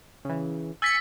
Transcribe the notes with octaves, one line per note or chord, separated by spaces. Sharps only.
C#3 E3
G#5 E6 A6 B6 C#7